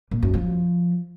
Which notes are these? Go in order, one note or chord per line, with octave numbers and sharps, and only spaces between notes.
A#2
F#2
F3